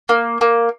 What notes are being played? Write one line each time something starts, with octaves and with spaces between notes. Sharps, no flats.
A#3
A#3